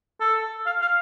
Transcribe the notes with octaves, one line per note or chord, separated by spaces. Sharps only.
A4
F5
F5